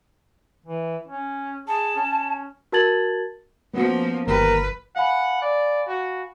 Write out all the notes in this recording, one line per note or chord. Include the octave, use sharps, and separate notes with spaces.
E3
C#4
G#4 A5
C#4
F#4 A#4 A5 G#6 A6 F#7
F3 A#3 B3 C#4 F#4
G1 D#2 G4 A#4 B4
F5 F#5 G#5 B5
D5
F#4